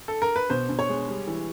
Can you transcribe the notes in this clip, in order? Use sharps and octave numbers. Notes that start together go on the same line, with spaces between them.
A4
A#4
B4
B2 C5
B2
C#5
G#3
G3
E3